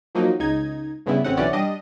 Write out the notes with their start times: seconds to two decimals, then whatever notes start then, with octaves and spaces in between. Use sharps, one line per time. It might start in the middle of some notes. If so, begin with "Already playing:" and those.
0.15 F3 F#3 A#3 D#4
0.39 C#2 D#4 G#6
1.06 G2 C#3 B3 E4
1.24 A1 C4 C#4 F#5
1.37 B1 E3 C#4 D5 F#5
1.53 G3 D4 D#5